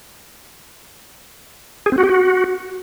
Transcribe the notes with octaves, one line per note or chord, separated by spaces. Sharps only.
G#4
C4
F#4
G4
F#4